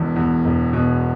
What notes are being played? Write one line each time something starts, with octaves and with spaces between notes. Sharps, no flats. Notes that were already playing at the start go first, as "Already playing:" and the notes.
Already playing: E1 E2 B2
E2
E1
B2